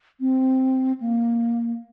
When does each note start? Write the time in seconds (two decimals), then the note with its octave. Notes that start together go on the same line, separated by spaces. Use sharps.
0.20 C4
1.00 A#3